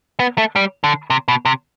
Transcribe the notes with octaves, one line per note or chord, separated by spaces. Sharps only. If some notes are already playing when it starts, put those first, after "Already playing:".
B3
A3
G3
D3
C3
B2
C3